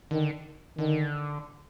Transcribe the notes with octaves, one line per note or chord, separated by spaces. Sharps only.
D3 D#3
D3 D#3